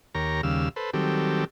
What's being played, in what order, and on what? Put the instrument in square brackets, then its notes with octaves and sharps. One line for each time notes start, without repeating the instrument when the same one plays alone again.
[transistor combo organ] D#2 G4 A#4 C#5 A#5
D#2 C#3 G3 F5 E6
A4 B4 C5
D#3 F#3 G3 C4 G4 A4